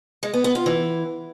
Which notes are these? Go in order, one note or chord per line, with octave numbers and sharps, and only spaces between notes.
G#3
B3
B3
F4
E3